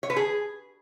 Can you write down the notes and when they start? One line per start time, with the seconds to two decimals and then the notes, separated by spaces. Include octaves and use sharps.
0.03 C#5
0.10 B4
0.16 G#4